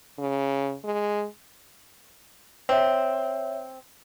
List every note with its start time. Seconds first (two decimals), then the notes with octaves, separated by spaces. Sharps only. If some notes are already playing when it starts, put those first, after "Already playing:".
0.19 C#3
0.84 G#3
2.69 C4 C#5 E5